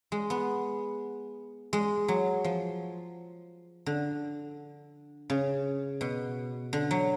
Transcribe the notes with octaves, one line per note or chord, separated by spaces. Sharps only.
G#3
B3
G#3
F#3
F3
D3
C#3
B2
D3
F#3